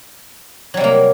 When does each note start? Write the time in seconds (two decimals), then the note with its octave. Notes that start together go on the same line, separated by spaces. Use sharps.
0.74 F#3
0.77 G3
0.80 C3
0.84 A#3